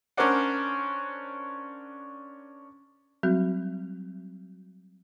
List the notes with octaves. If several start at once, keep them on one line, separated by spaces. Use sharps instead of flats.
C#4 D4 A#4 C5 D5 F#5
F#3 G3 C4 F#4